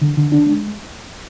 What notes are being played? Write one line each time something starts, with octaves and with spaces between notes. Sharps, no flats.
D3
D3
D4
G#3